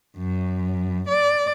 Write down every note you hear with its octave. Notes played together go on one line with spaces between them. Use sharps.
F#2
D5